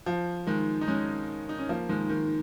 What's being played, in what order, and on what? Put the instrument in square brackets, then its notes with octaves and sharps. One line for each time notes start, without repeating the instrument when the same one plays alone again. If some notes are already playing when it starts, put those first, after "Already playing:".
[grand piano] F3
D#3 G#3
D#4
G#3 C#4
D#4
C#4
F3 A#3
D#3 G#3
D#3